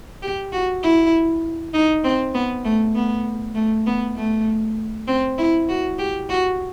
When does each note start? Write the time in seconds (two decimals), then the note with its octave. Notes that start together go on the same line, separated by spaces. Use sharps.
0.22 G4
0.52 F#4
0.83 E4
1.74 D#4
2.04 C4
2.34 B3
2.65 A3
2.95 B3
3.55 A3
3.87 B3
4.16 A3
5.07 C4
5.38 E4
5.69 F#4
5.99 G4
6.29 F#4